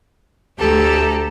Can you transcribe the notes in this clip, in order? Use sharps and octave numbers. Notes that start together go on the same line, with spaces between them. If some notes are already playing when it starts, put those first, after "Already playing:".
D2 A3 G4 A4 A#5